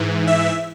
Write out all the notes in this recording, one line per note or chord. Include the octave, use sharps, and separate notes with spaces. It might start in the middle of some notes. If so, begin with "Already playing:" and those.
Already playing: G#2 E3
E5